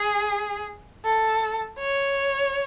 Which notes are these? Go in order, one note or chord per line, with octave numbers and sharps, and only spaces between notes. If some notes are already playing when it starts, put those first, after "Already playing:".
Already playing: G#4
A4
C#5